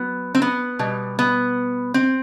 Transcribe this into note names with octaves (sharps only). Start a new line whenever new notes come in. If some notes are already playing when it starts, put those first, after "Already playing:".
Already playing: F#3 B3
C4
B3
B2 G3
B3
C4